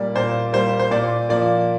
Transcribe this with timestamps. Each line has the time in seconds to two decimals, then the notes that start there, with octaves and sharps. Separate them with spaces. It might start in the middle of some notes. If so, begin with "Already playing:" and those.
Already playing: A#2 G3 A#3 D5
0.16 A#2 C5
0.53 G3 A#3 C5
0.79 C5
0.91 A#2 D5
1.29 F3 A#3 D5